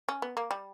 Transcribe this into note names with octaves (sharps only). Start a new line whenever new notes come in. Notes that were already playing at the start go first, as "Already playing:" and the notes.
C#4
B3
A#3
G3